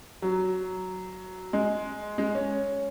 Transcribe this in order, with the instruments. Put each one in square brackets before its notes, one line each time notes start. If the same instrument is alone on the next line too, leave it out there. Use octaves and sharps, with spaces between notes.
[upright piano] F#3
G#3
G#3
C#4